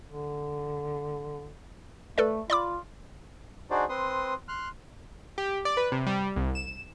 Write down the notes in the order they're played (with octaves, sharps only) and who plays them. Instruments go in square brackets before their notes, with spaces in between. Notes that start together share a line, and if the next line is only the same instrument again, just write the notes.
[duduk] D3
[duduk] A3 [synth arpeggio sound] A4 B4 D5
[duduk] F4 [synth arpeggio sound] D5 B5 D6
[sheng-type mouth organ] D4 D#4 F#4 G#4 C5 D5
C4 B4 C6 D#6
C6 F6 F#6
[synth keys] G4
D5
B4
C3
G3
C2
E7